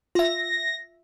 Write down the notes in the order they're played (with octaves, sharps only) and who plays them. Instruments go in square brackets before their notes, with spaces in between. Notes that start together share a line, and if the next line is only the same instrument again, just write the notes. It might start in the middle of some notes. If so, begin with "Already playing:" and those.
[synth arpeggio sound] F4 E5 [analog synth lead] A#6